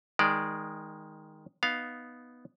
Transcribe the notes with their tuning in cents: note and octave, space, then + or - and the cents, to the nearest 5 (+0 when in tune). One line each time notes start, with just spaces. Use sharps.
D#3 +10 G#3 -15 D5 +0
B3 +0 D#4 +0 F5 +0